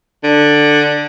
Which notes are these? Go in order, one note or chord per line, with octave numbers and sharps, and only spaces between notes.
D3